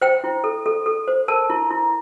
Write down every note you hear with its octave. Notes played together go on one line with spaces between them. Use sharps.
C5 G5
E4
A4
A4
A4
C5
A#4 A5
E4
E4